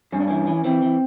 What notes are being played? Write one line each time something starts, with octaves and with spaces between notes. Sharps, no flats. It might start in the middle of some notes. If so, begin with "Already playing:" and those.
G2 C#4
D4
E3 C#4
E3
E3 C4
E3